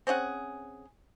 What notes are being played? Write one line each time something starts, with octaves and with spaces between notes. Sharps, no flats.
C4 C#4 G#4 F#5